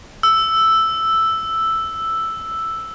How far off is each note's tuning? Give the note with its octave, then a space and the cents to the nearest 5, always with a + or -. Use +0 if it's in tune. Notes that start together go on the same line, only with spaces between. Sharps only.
E6 +0